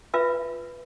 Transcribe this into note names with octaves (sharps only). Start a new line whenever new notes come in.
F4 B4 E5